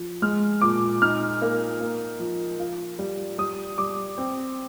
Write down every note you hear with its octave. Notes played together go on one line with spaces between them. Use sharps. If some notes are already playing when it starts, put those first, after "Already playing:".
Already playing: F3
G#3 F6
A#2 D6
D#4 F6
A#3
A#3
F3
F4
G3
G3 D#6
G3 D6
C4